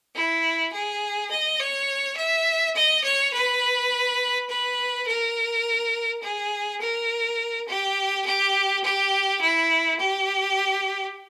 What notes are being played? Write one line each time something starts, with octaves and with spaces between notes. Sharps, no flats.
E4
G#4
D#5
C#5
E5
D#5
C#5
B4
B4
A#4
G#4
A#4
G4
G4
G4
E4
G4